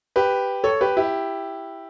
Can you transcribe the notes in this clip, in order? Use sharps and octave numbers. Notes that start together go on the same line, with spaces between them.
G4 B4
A4 C#5
G4 B4
E4 G4